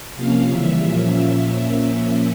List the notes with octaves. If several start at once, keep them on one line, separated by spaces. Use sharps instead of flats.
C3 F3 A#3 C#4 F5
C#3 E3 G3 E5
A#2 F3 A#3 C#4